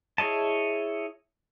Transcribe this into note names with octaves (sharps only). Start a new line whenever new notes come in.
E4 G#4 C#5 D#5 A5